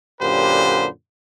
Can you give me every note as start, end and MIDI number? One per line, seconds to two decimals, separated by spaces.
0.21 0.87 42
0.21 0.87 46
0.21 0.87 50
0.21 0.87 67
0.21 0.87 71
0.21 0.87 72